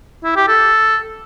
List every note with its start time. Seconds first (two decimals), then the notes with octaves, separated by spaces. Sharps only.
0.24 E4
0.36 G4
0.48 A4